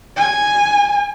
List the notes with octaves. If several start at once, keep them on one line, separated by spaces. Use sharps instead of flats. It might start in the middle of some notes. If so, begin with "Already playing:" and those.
G#5